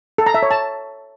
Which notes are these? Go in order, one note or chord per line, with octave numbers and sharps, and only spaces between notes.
A4
A#5
E5
C#5
A5